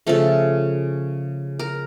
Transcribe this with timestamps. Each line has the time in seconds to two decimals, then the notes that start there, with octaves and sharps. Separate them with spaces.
0.07 C#3 F3 A3 A4
1.59 A#4